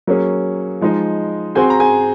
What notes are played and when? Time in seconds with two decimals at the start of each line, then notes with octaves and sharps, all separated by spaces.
0.07 F#3 A#3 C#4 G#4
0.81 F3 G#3 D#4
1.55 C4 F#4 G#4 C5 G#5
1.70 A#5
1.80 G#4 G#5